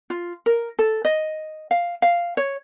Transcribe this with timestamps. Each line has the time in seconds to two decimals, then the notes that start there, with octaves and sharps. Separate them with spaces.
0.10 F4
0.46 A#4
0.79 A4
1.05 D#5
1.71 F5
2.02 F5
2.37 C#5